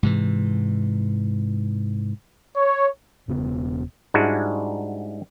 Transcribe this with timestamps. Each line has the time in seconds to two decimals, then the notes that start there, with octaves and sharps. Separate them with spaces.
0.03 G#2 C3 E3
2.57 C#5
3.28 E1 C#3 B3
4.14 G#2 G3 G#3 D4 E4 F#4